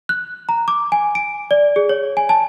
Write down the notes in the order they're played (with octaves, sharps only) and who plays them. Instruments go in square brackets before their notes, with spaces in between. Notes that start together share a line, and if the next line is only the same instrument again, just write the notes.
[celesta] F#6
A#5
D6
G#5
D7
D5
G#4
C#5
G#5
A5